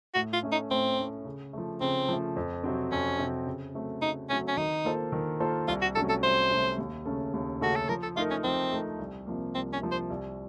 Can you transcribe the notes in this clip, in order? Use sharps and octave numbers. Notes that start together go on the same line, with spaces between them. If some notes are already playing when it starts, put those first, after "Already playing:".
A2 F#4
F4
A3 C#4
D#4
A2 C4
A3 C#4
C#3
F3 A3
C#3 C4
F3 A3
F2
C3 F#3 C4
F2 C#4
C3 F#3 C4
C#3
F#3 A3 C4
C#3 D#4
F#3 A3 C4 C#4
C#4
D#3 D#4
A#3 F4 A4 C5
D#3
A#3 F4 A4 C5
C2 F4
F#4
C3 F#3 A3 C#4 A4
A4
C2 C5
C3 F#3 A3 C#4
D#2
C#3 A3 C#4 A4
D#2
C#3 A3 C#4 F#4 A4
A4
F3 A#4
A4
A3 D#4 F4 A#4
C#4
F3 C4
A3 D#4 A#4
C2
C3 F3 A#3
C2 C4
C#4
C3 F3 A#3
C5
C2